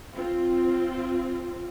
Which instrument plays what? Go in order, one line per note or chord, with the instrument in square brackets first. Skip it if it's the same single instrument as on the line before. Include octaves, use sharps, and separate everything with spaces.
[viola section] C4 F4